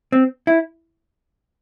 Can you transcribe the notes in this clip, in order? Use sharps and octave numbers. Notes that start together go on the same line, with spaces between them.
C4
E4